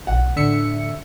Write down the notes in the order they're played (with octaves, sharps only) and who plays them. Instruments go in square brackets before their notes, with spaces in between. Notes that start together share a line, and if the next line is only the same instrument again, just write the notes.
[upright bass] B1 G#3 [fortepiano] F#5
[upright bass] A2 [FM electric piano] D3 E5 C#7